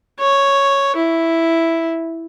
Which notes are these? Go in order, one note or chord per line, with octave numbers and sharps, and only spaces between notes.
C#5
E4